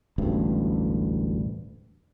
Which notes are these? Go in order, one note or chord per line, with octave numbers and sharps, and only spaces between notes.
E1 A1 D2 G2